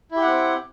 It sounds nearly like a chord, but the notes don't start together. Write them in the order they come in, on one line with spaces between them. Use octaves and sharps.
E4 G4 F#5 C4